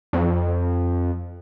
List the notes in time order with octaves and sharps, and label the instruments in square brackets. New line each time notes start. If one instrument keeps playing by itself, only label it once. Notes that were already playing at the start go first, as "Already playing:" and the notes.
[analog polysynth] F2